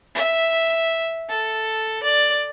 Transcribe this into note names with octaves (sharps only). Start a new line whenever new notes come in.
E5
A4
D5